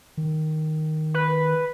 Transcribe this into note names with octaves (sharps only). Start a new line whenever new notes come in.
D#3
B4